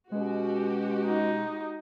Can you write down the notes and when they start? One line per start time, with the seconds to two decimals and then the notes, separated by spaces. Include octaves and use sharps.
0.12 B2 G#3 C#4 F#4 G4
1.05 D#4